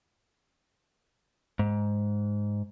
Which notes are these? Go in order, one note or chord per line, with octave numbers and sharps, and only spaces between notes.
G#2